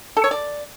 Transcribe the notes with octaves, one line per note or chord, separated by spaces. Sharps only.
A4
C#5
D5